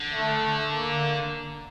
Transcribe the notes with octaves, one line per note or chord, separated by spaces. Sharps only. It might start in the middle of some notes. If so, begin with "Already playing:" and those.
Already playing: D3
A3
A#3